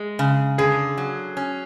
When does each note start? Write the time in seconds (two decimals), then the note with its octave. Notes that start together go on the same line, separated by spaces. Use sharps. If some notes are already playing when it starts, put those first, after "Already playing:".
Already playing: G#3
0.19 C#3
0.58 D3 G#4
0.98 F#3
1.37 C#4